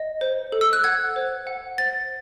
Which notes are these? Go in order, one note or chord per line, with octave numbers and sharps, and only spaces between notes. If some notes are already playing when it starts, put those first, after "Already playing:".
Already playing: D#5
C5
A4
E6
F#6
F#5 G#6
C5
F#5
C5 A6